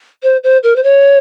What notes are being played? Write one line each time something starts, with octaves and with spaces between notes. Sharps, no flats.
C5
C5
A#4
C5
C#5